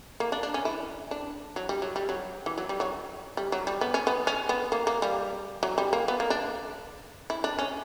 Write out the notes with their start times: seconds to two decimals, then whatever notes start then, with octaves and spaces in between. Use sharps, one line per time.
0.20 A#3
0.32 D4
0.43 D4
0.54 C#4
0.65 E4
1.11 D4
1.56 F#3
1.69 G3
1.82 F#3
1.96 G3
2.09 F#3
2.46 E3
2.58 F#3
2.69 G3
2.80 F#3
3.37 G3
3.52 F#3
3.67 G3
3.81 B3
3.94 C#4
4.07 B3
4.27 C#4
4.49 B3
4.72 A#3
4.87 A#3
5.02 G3
5.63 F#3
5.78 G3
5.93 A#3
6.08 B3
6.20 A#3
6.30 D4
7.30 E4
7.44 D4
7.59 C#4